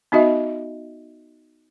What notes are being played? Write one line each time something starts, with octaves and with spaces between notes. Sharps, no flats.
B3 D#4 F#4 D#5 E5